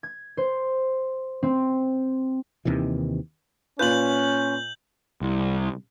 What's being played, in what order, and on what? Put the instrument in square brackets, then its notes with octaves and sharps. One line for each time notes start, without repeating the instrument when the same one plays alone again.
[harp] G#6
C5
C4
[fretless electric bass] D#2 C3 D#3 E3
[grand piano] A#2 F4 B4 [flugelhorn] C#4 [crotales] G6 F#7
[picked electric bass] C2